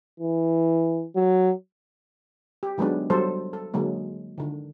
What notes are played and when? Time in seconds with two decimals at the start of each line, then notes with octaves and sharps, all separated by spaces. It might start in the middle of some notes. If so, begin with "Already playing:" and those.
0.20 E3
1.16 F#3
2.63 G4
2.78 D#3 F#3 G#3 B3 D4
3.10 F#3 G3 A4 C5
3.53 A4
3.74 D3 F#3 G#3 A#3
4.38 D3 D#3